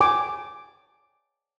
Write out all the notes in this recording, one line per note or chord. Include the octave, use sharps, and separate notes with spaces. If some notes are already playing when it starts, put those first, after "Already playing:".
G#5 D6